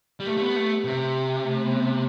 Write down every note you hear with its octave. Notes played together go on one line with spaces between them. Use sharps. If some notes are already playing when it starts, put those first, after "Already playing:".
G3
A3 G4
A3
B3
A3
C3
A3
B3
C4